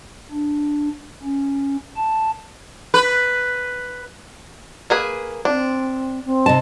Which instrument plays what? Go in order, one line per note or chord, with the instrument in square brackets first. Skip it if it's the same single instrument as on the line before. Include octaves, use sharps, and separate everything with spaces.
[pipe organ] D4
C#4
A5
[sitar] B4
[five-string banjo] A#3 G#4 B4
[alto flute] C4 [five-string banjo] D4
[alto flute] C4
[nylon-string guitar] C3 D#5 A5